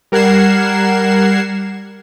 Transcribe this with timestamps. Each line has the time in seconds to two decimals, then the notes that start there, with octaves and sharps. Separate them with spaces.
0.12 G3 A#4 F#5 G#6 C7 E7